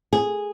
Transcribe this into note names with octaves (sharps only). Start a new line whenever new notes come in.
G#4